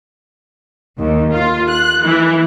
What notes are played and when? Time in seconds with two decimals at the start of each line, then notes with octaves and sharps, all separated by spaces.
0.98 D#2
1.32 F4
1.70 F#6
2.04 E3